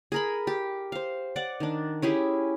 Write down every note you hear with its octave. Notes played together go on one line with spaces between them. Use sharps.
G#4 A#4 B5
G4
C5 F5
D5 F#5
D#3 D4
C#4 E4 G4 G#4